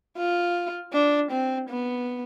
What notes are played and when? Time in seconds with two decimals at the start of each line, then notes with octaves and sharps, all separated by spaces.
0.17 F4
0.93 D4
1.31 C4
1.69 B3